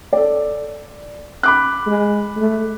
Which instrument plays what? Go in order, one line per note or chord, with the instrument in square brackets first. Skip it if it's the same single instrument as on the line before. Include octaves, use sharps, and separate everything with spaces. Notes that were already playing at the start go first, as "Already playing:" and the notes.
[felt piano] A4 D5
B5 D6 F#6
[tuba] G#3
A3